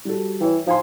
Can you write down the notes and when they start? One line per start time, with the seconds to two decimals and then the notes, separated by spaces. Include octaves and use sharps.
0.05 G3 F#4 A4
0.41 E3 C#5 G5
0.67 F3 D#4 G#5 C6